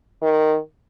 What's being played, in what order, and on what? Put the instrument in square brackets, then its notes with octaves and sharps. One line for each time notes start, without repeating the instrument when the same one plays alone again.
[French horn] D#3